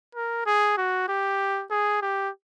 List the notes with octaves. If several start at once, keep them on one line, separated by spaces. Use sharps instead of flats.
A#4
G#4
F#4
G4
G#4
G4